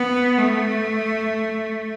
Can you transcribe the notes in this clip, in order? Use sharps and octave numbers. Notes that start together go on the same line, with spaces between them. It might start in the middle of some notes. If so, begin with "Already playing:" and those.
Already playing: B3
A3